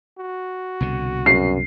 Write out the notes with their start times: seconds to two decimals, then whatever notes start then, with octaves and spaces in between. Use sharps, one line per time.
0.18 F#4
0.80 C2 B2 D3
1.26 F#2 C7